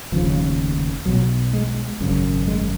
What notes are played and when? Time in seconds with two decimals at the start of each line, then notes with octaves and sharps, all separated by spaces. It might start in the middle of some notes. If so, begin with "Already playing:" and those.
0.12 F1 D#2 C#3 F3
1.06 B1 B2 F#3
1.53 G#3
2.00 G#1 F#2 C#3
2.47 G#3